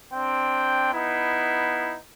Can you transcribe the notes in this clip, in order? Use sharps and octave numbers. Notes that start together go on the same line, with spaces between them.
C4 D4 G5
B3 D#4 E4